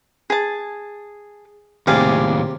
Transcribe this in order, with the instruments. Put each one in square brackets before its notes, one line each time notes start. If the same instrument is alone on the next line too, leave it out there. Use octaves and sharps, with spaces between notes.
[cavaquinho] G#4 A5
[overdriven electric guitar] D#2 A2 [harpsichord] C3 [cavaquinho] G#4 D5 F5